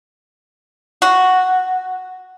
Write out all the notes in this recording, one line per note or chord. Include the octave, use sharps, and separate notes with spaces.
F#4